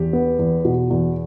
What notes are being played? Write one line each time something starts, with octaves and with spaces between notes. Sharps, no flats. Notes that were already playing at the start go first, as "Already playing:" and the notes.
Already playing: E2 G4
B3
E2
B2
E2